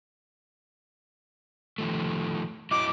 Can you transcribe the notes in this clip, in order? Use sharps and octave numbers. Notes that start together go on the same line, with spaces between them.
D#3 F3 A3
F#3 E4 D#5 D6